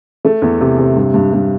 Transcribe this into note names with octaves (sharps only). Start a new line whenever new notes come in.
A3
E2
C3
C3
G2
G2
G2